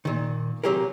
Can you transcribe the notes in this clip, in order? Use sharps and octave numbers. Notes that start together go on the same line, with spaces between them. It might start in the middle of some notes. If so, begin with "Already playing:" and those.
A#2 D#3
C3 D#3 F#3 G4 G#4 A#4